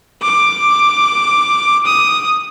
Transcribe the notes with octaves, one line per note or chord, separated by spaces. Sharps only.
D6
D#6